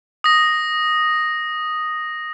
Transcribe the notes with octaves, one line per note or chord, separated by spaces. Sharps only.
D#6 A#6